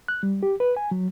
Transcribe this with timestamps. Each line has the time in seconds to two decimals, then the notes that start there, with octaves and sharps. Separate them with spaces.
0.08 F#6
0.23 G3
0.43 G4
0.60 B4
0.77 G#5
0.91 F#3